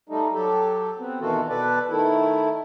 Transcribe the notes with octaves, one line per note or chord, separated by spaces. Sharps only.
G3 A3 D#4
F#3 G4 A4
B3 C4
B2 D#3 E3 F4 F#4 A4
B2 A4 B4 D5
D#3 A3 E4